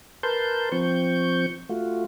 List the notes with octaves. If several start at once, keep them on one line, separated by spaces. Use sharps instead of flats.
A#4 B4 A5 C6 G6
F3 C4 C#6 G6
A3 F4 F#4